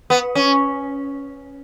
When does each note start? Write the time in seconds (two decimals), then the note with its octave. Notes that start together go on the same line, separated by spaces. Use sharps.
0.10 B3
0.35 C#4